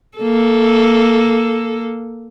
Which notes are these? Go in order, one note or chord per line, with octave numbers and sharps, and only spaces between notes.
A#3 A4